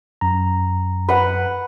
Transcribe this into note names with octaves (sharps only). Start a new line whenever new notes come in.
F#2 A#5
B4 F#5